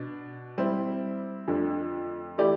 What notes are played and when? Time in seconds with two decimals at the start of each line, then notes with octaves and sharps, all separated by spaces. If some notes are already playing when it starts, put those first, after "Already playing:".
Already playing: B2 D4
0.58 G3 C4 E4
1.48 F2 D3 A3 D4
2.38 E3 A3 E4 G4 D5